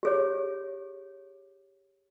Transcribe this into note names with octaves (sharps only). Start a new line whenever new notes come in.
G4 G#4 C#5